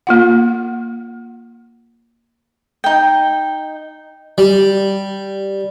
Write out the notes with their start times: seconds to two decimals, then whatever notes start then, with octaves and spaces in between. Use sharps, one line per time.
0.07 A#3 F4 F#5
2.84 D#4 G5
4.38 G3